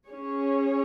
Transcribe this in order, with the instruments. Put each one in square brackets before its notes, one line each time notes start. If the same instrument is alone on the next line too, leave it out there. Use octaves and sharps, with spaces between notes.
[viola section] C#4 G#4 C#5